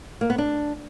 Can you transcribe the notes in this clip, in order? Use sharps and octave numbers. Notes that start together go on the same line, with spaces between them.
A#3
B3
D4